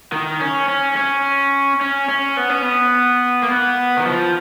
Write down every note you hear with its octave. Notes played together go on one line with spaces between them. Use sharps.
D#3
C#4
C#4
C#4
C#4
C#4
B3
C#4
B3
A#3
B3
D#3
F3